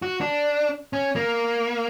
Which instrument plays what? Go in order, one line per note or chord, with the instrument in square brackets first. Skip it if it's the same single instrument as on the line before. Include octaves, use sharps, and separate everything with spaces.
[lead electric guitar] F#4
D4
C#4
A#3